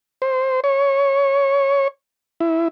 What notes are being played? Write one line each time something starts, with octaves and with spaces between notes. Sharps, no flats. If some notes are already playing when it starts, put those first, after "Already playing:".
C5
C#5
E4